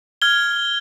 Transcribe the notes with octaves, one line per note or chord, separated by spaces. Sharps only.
F6 G#6 G7